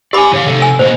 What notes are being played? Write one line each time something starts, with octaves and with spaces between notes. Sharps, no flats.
G4 D5 G#5 B5 D6
E2 C#5 F5
C3 A4
G#5
B2 A#3 C5 D#5